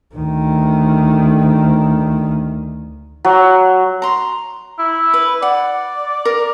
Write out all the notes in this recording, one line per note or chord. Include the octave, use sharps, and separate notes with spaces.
D2 D#3
F#3
A#5 C6
E4
B4
D5 F#5
A#4